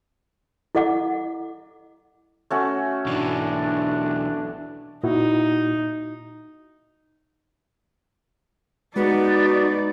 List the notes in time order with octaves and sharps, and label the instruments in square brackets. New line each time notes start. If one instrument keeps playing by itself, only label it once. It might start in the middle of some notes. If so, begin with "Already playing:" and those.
[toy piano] E4 A4 D#5 F#5 D6
[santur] A3 C#4 F#4
[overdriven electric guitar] B1 E3 [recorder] D4
[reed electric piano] A#2 E4 F#4 [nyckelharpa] D#4
[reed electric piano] G#3 [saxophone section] B3 [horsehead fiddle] D#4 D5 [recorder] F#4